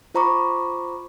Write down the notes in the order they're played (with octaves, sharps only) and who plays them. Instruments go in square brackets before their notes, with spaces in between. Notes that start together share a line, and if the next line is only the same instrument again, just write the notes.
[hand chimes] F4 C5 A#5 B5 C#6 D6